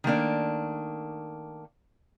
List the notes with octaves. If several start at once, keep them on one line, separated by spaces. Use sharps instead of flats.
D#3 A3 A#3 D4